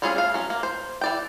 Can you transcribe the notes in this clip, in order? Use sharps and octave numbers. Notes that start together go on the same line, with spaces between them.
G3 C4 C#4 F4 G#4
A3 F5
F#3 C#4
A#3
C5
E3 D5 G5